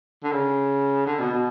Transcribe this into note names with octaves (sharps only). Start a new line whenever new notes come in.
D3
C#3
D3
B2
B2